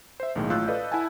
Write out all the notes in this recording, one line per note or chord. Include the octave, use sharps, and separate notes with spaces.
C5 E5
B1 A2 D#3 G#3 A#3
A1 A2 F4 E6 F#6 G6
A4 B4 D5 D#5 F5
E4 E5 F#5 G#5 A5